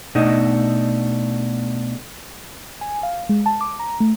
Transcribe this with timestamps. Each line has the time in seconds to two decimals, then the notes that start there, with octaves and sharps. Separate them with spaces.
0.15 B2 A3 B3 D4 D#4 D#5
2.81 G#5
3.03 F5
3.29 G#3
3.46 A5
3.61 D6
3.79 A#5
4.00 A3